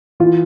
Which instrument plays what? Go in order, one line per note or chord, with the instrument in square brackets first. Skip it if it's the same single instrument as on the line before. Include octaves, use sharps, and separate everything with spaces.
[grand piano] E3 F4